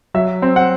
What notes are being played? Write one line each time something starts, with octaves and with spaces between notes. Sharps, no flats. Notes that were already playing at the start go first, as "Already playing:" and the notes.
F#3 E5
C4
F#5